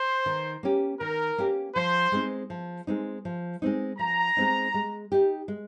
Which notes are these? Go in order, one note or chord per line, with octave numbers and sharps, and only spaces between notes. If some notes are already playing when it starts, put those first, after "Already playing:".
Already playing: C5
D#3
A#3 C#4 G4
D#3 A#4
A#3 C#4 G4
F3 C5
G#3 C4 D#4
F3
G#3 C4 D#4
F3
G#3 C4 D#4
F3 A#5
G#3 C4 D#4
G#3
D#4 G4
G#3